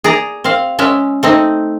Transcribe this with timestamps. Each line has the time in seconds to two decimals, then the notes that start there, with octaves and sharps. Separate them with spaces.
0.04 G#4 D5 A#5
0.44 C4 F5
0.79 G#3 C#4 E5
1.23 A3 C4 D#4